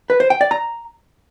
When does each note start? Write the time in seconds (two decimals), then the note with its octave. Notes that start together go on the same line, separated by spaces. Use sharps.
0.10 B4
0.20 C5
0.30 G5
0.41 D5
0.51 A#5